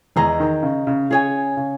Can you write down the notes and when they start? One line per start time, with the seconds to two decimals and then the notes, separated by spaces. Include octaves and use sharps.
0.16 E2 E3 G#4 D#5 A#5
0.40 D#3
0.63 C#3
0.87 C#3
1.10 C#3 G#4 C#5 G#5
1.57 C#3